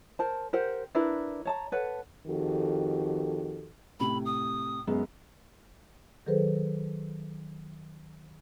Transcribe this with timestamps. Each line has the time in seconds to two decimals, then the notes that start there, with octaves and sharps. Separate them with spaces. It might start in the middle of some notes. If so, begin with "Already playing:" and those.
0.19 A#4 C5 A5
0.53 G4 A#4 C5 F#5
0.95 D4 E4 A#4 B4
1.45 C#5 A5 A#5
1.72 A4 B4 C#5 F#5
2.27 F2 D#3 F#4 G4 A4
4.00 A2 C3 B5
4.25 D#6
4.87 F#2 G#3 B3
6.26 D#3 F#3 G#4 A4 B4 C5